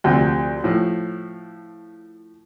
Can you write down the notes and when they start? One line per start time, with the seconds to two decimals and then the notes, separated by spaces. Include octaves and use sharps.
0.04 D2 C3 F3 C4
0.64 A2 F3